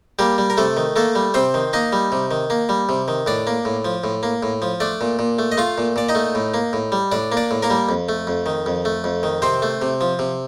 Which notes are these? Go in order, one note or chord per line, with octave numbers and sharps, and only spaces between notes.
G3 A#3 G4
G3
A#4
C3 A3 A4
D#3
A3 A#3 A4
G3
C3 C4 C5
D#3
A#3 D#4 D#5
G3
C3
D#3
A#3
G3
C3
D#3
A2 D4 D5
A#3
A2
F3
A2
A#3
A2
F3
A3 D4 D5
A#2
A#2
A3
D#5
A3 F4 F5
A#2
A#2 D5
D#4 D#5
A3
A2
A#3
A2
G3
A2 D4 D5
A#3
D4 D5
A2
A#3 A#4
G3
F2
A3
F2
D#3
F2
A3
F2
D#3
C3 C4 C5
A3
C3
F3
C3